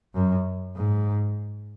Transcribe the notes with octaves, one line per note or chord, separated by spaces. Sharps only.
F#2
G#2